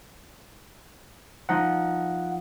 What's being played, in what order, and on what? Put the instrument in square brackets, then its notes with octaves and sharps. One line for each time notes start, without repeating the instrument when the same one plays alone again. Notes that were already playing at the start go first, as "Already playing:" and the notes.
[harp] F3 D#4 [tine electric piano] F#5